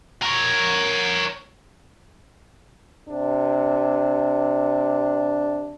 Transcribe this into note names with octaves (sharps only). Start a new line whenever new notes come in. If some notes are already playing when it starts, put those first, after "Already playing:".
A#4 C#5
C3 D4